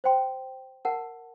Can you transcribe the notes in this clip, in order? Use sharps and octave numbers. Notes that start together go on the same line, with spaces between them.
C5 G5 C6
A#4 F#5 A5